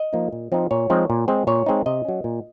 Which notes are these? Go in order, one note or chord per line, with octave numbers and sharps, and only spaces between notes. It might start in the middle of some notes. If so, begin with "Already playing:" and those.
Already playing: D#5
F3 A#3 D#4
A#2
F3 C4 D#4
A#2 C#5
F3 G#3 C4 D#4
A#2
G#3 C4
A#2 C#5
G#3 C4 D#4
C3 D#5
F#3 C#4
A#2